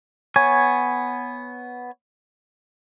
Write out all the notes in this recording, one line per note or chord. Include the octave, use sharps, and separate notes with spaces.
B3 C#5 G#5